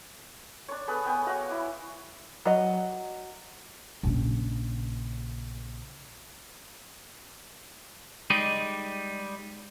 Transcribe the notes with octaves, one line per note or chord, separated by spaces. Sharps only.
D4 C#5
B3 G#4 A4 B4
B3 G5 G#5
F#4 F5 F#5
E4 D6
F#3 D#5
A#1 C#3
G3 G#3 D#4 D5 D#5